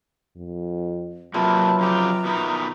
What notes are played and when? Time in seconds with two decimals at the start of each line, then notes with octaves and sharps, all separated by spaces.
0.37 F2
1.34 C3 F#3 A#3 F4 B4 E5 A5
1.79 F2 C#3 G4 A#5
2.25 B2 D#3 E4